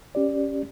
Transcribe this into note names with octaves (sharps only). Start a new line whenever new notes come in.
C#4 G4 D5